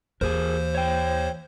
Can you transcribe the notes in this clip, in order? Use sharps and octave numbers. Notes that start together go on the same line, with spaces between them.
D#2 E3 G#4 A#4 C5
C#5 G5